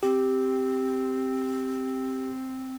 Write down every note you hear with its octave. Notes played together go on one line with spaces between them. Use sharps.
C4 G4